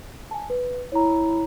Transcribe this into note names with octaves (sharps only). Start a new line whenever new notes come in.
G#5 A5
B4
E4 C#5 A#5